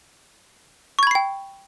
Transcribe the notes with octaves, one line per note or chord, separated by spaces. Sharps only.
G5 B5 C#6 G#6 C7